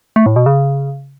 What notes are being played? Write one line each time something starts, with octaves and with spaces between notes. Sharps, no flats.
A3
A2
B2
C#3